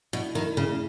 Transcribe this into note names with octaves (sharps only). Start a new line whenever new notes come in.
B2 E4
D#3 E4
A2 C#3